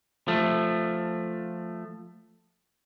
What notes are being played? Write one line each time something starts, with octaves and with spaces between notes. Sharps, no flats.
F3 A3